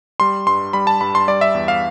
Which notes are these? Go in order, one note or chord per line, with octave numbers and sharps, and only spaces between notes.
G3 C6
G2 C6
G3 B5
A5
G2 B5
C6
G3 D5
E5
E2
F5